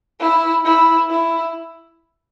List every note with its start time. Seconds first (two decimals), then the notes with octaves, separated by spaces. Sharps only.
0.20 E4
0.65 E4
1.10 E4